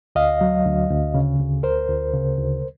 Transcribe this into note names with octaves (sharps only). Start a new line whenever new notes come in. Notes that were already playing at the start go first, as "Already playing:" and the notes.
D2 D#5 F5
F#3
D2
D2
C#3
D2
D2 A#4 C5
D2
C#3
D2